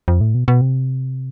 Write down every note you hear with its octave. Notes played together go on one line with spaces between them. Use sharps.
F2
A2
B2
B2
C3